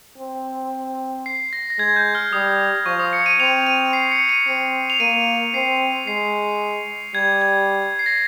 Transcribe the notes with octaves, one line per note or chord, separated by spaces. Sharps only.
C4
C7
A#6
A#6
G#3 G#6
G6
F6
G3 D#6
F3 C#6
D#6
C#7
D#7
C4 F7
D#7
C7
C#7
D#7
C4
F7
A#3 D#7
C4 C7
G#3 C7
G3 G#6
G#6
C7
A#6